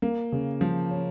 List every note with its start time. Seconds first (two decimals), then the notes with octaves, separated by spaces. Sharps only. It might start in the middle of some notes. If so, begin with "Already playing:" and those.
0.02 A#3
0.32 C#3
0.61 F3
0.91 C#4